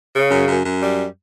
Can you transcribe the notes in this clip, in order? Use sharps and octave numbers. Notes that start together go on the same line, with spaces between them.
C#3
F#2
F#2
F#2
G3